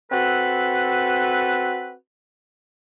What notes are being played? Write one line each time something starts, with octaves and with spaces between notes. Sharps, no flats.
C4 F#4 A4 B4